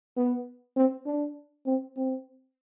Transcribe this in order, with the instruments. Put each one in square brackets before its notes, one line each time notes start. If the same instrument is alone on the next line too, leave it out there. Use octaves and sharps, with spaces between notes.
[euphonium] B3
C4
D4
C4
C4